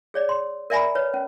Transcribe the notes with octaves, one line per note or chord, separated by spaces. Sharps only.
G#4 C#5 D5
C6
A#4 D5 E5 G#5 A#5 B5
B4 C#5
C#4